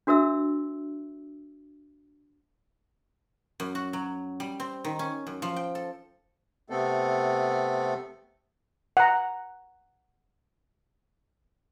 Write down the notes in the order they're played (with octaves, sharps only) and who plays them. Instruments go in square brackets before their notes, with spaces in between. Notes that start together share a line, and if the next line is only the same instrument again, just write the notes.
[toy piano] D4 F#4 A#4 E5 E6
[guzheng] F#2
F#4
F#3
G3
C4
D#3
C#4
F#2
F3
G5
A4
[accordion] C3 A3 B3 C4 A4
[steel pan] F#5 A#5